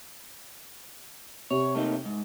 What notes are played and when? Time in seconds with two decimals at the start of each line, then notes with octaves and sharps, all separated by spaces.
1.50 C3 C#5
1.75 A3 A#3 D#4
2.05 G#2